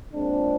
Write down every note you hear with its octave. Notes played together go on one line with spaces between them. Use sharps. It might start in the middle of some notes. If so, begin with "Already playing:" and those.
A#2 G#3 C4 D4